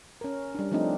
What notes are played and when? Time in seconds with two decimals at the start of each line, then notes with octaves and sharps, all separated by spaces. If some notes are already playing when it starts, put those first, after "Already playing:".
0.21 C#4 A#4
0.55 G3 D4
0.72 F3 A3 C4 D4 D#4